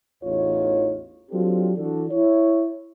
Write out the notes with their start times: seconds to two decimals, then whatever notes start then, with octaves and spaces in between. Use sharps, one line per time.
0.24 A1 E2 D#4 F4 C#5
1.31 F#3 C4 D4 F4 G4 A4
1.78 E3 D4 F#4 A4
2.11 E4 C#5